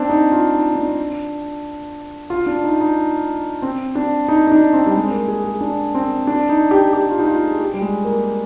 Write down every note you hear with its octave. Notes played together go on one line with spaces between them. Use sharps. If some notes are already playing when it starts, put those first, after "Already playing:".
Already playing: C4 D4
D#4
F4
D#4
D4
F4
D4
D#4
D#4
C4
D4
D#4
D#4
D4
C4
G3
G#3
A#3
G#4
G#4
D4
C4
D4
D#4
G4
G4
F4
D#4
F4
G#4
G4
G3
G#3
A#3